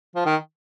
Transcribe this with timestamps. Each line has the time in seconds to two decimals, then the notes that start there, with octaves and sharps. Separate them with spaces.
0.15 F3
0.25 D#3